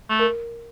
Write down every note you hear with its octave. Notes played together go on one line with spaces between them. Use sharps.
A3
A#4